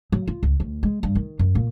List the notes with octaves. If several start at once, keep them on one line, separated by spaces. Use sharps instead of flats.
F#3
F4
C#2
D2
G#3
G2
D#3
F#2
A#2